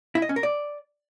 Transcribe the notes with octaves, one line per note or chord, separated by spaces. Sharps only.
E4
D#5
C#4
A#4
D5